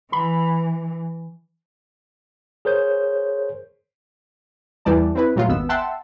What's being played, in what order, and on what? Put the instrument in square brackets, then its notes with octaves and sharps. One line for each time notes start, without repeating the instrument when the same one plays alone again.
[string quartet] E3 [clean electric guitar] B5
[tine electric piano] G#4 A#4 C5 C#5 G6
[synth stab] E2 E3 G3 D5 A5
C4 E4 B4
A#2 F#3 A3 F4
G#1 D#2 B3 E6
E5 F#5 G5 A5 C6 E6